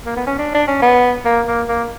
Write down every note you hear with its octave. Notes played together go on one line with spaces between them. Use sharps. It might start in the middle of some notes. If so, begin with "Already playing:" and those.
A#3
B3
C#4
D4
D4
C#4
B3
A#3
A#3
A#3